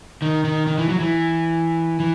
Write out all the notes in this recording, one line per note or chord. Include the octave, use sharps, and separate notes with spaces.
D#3
D#3
D#3
E3
F#3
E3
E3